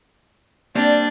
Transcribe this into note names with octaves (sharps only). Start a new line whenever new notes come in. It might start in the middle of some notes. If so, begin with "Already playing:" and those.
G3 A#3 C4 D4